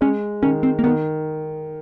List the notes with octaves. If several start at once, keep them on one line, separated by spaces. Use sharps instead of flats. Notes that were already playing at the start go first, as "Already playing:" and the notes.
G#3 C#4
D#3 C#4
C4
A#3
D#3 B3